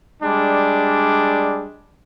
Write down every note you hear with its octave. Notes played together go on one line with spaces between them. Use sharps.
G3 G#3 D4